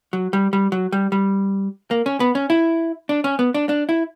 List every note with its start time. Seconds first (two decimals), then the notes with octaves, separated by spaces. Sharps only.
0.13 F#3
0.33 G3
0.53 G3
0.72 F#3
0.92 G3
1.12 G3
1.91 A#3
2.06 C#4
2.20 B3
2.35 C#4
2.50 E4
3.09 D4
3.24 C#4
3.39 B3
3.54 D4
3.69 D4
3.89 E4